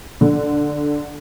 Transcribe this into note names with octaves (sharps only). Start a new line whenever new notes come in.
D3